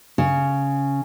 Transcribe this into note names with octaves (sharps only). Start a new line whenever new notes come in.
C#3